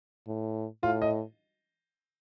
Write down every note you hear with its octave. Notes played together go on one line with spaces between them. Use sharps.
A2
A2 F4
D#5